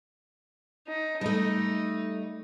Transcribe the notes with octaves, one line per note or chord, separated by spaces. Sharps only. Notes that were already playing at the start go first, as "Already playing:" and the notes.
D#4
G3 A3 D#4